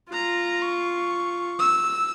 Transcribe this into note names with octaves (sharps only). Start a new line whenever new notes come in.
F4 A#5
C#6
E6